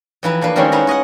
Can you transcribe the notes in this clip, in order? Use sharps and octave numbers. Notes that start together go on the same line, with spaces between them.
F2 E3 E4 B4 A#5
A3 A#3 D4 B4
D#3 G3 G#3 C4 C#4 E4
D#4 E4 B4 F#5 A#5
C#5 D#5 E5 F#5